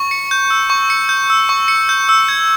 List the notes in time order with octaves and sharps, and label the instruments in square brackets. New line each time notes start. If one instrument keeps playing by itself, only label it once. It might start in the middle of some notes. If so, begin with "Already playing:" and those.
Already playing: [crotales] C#6
C#7
G6
E6
C#6
C#7
G6
E6
C#6
C#7
G6
E6
G#6